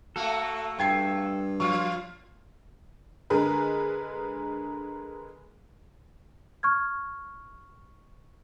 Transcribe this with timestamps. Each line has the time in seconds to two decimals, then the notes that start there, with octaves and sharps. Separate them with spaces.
0.16 A3 A#3 F#4 A4
0.79 G2 G5 G#6 C7
1.60 F3 F4 C#6
3.30 D3 G#3 G#4 A#4 B4
6.63 C#6 F6 G#6